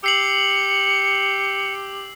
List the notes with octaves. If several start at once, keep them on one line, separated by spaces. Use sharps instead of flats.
G4 E6 C7 C#7 F#7